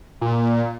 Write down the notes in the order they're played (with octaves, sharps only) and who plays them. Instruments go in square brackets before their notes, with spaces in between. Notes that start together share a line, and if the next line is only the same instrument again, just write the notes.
[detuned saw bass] A#2